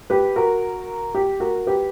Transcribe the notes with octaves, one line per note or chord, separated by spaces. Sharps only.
G4 B4
F#4 A#4
G4
F#4 A#4
G4 B4